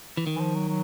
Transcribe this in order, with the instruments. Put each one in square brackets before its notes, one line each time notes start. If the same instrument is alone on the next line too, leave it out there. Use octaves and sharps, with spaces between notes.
[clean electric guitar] E3
D#3
[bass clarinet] E3
F3
F#3
F#3